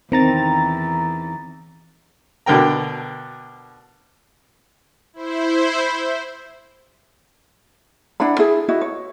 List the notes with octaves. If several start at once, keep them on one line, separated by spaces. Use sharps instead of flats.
E2 D#3 C4 A#5 A6
B2 D3 A#4 G5 A#5
E4 C5
D4 E4 F#5 B5
E4 G#4
E4 F#4 D#5
C#5